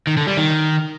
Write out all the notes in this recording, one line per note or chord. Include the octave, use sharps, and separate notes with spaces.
D#3
D3
G3
D#3